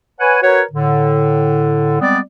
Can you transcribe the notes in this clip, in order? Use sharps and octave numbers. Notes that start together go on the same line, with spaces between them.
B4 C#5 F#5 G#5
F#4 A#4 B4 C#5
A2 D3
G3 G#3 B3 C4 D5